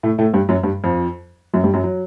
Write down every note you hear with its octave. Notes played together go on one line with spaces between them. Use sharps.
A2 A3
A2 A3
G2 G3
F#2 F#3
G2 G3
F2 F3
F#2 F#3
G2 G3
F#2 F#3
F#3